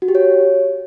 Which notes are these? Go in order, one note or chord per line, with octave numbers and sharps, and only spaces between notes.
F#4
G4
C#5